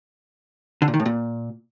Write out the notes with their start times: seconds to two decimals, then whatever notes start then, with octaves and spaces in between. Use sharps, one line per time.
0.82 D3
0.88 A#2
0.94 D#3
1.00 A2
1.06 A#2